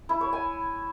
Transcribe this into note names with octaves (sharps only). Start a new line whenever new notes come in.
E4
C#5
G#5